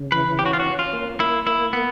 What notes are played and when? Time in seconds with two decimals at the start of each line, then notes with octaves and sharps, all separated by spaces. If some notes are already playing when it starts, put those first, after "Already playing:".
Already playing: C#3
0.12 E3 B4
0.39 C#4 G4
0.46 F#4
0.53 F4
0.60 F#4
0.66 C#4
0.79 F4
0.93 A#3
1.20 A#3 E4
1.46 A#3 E4
1.73 A#3 B3